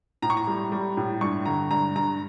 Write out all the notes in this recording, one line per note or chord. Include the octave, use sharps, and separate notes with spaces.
A2 A#5
C#6
A#5
G3
G3
A2
G2 C#6
D3 A#5
G2 A#5
G2 A#5